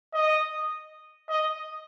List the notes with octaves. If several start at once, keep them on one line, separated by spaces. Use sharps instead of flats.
D#5
D#5